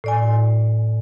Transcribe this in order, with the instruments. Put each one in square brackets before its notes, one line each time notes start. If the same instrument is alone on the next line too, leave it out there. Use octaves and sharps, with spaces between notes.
[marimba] A2 D5 G#5